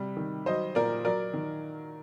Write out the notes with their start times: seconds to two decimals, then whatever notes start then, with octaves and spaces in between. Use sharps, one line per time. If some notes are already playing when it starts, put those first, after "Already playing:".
Already playing: C3 G3
0.17 D#3
0.46 F#3 C5 D#5
0.75 A#2 A#4 D5
1.05 F#3 A#4 D5
1.34 D#3